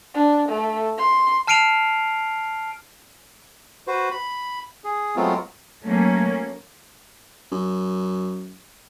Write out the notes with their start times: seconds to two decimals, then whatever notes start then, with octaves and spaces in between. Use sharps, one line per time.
0.14 D4
0.49 A3
0.98 C6
1.47 A5 F6 C7 D7 D#7 F7
3.87 F#4 B4 C5
4.11 B5
4.84 G#4
5.16 F#3 G#3 A3 B3 C4 F4
5.84 F#3 A3 A#3 C#4
7.52 F#2